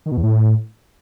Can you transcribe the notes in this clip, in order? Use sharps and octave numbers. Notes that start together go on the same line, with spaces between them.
D#3
B2
E2
A2